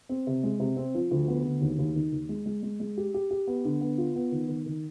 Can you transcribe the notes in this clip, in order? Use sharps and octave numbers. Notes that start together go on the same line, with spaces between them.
C4
C3
G#3
C3
C4
F3
D2
B3
D2
D#2
D#2
D#3
D#2
G#3
G#3
G#3
G#3
G4
G4
G4
B3
D3
B3
F4
B3
D#3
D#3
D#3